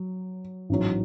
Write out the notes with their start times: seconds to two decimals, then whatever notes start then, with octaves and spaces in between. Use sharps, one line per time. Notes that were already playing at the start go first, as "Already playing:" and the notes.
Already playing: F#3
0.69 A1 G#2 F#3